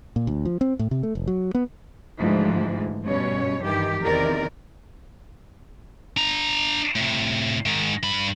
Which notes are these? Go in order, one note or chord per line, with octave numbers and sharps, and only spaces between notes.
A#2
D2
F3
C4
A2
C3
A3
F1
F#3
B3
D2 G#2 E3 F3
G2 B2 C#4 C#5
G2 D#3 E3 G4
E2 C3 D#3 A#4 D5
D4 A#5
A2 C3
G#2 D#3
G2 B5